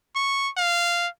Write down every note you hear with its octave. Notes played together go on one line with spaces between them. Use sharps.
C#6
F5